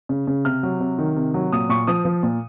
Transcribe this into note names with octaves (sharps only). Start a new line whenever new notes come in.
C#3
C#3
C3 F6
F#3
C3
D#3
C3
F#3
A#2 D#6
A#2 C#6
F3 D#6
F3
A#2